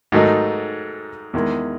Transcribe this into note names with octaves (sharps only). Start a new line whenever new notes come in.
G#2 D#3 F#3 A3 D#4
E2 D#3 G#3